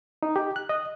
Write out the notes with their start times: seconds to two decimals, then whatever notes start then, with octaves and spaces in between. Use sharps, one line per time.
0.23 D#4
0.36 G4
0.56 F#6
0.69 D#5